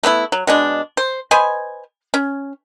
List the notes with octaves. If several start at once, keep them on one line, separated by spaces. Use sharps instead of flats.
A3 B3 C#4 E4
F#3
B2 G#3 D4
C5
B4 C5 D#5 G#5
C#4